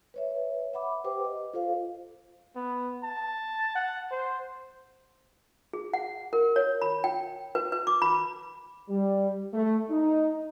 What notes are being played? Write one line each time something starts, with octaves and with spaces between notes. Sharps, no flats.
B4 C#5 E5
E5 F#5 B5 D6
G4 B4 C5 G5 D6
D#5
F4 A4 C5 F5
B3
A5
F#5
C5
G#4
F#5
A#4
C#5
B5
G5
B4
B4
D6
B5
G3
A3
D#4